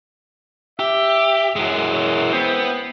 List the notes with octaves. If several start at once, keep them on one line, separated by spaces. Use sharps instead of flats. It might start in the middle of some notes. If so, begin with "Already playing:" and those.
G4 E5
F#2 E3 G#3
B3 C5 E5 G5